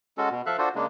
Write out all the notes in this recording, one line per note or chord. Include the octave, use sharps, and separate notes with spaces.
G#3 C#4 F#4 A4
B2
F3 A4 E5 F5 F#6
D4 F4 F#4 A4 C5
C#3 G#3 A#3 D4